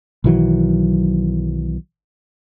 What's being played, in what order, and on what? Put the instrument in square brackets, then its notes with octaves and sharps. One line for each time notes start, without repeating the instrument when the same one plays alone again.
[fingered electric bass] B1 D#3 E3 F#3